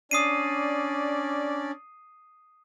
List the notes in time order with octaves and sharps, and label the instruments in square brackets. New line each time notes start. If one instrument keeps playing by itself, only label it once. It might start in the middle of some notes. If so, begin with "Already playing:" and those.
[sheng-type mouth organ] C#4 D4 D5 [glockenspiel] D#6 C7 D#7